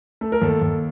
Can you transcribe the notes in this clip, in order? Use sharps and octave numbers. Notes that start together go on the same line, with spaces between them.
A3 A4
A#4
D#2 A4
D#2